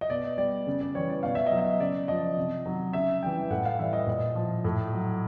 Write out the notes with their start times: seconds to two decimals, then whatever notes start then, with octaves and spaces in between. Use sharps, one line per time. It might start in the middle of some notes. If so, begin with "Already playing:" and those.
0.01 D#5
0.10 B2 D5
0.38 G3 D5
0.67 C#3
0.81 D5
0.94 E3 G3 C#5
1.10 D5
1.23 B2 F5
1.35 E5
1.46 F#3 D#5
1.58 E5
1.80 C#3 D5
2.08 F3 D#5
2.37 C3
2.66 D#3 F#3
2.93 C#3 E5
3.23 E3 G3 G5
3.50 A2 F#5
3.65 F5
3.79 E3 G3 E5
3.93 D#5
4.07 A#2
4.35 F3
4.65 A2
4.93 F#3